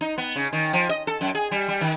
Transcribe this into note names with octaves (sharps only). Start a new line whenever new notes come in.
D#4
B3
C#3
D#3
F3
D#5
A4
F#2
G#4
G3
G3
D#3